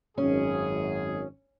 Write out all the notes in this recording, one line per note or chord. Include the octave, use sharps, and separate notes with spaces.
G#1 F#2 C#4 G#4